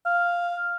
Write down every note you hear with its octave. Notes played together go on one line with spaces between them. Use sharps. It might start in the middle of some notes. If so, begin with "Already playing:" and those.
F5